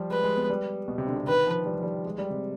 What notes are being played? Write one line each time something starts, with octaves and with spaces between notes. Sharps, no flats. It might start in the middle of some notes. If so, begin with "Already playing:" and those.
Already playing: F3 G3
G#3 B4
G#3
B3
G3
B2
C3
D3
C3
D#3 B4
F3
G3
F3
G3
G#3
G3
C3